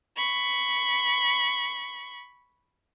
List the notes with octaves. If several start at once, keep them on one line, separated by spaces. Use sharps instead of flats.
B5 C#6